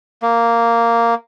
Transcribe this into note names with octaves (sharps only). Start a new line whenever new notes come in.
A#3